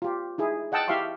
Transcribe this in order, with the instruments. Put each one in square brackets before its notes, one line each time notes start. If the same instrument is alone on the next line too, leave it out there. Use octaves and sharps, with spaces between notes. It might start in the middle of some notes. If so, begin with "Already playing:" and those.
[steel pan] F4 G4
D#4 E4 G#4
D#5 F#5 G5 A5 E6
E4 G4 E5 F5 C6 C#6